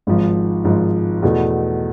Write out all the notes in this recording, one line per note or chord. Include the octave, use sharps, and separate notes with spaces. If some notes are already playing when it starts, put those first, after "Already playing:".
G#1 G#2 F3
G#1 G#2 F3
E2 B2 A3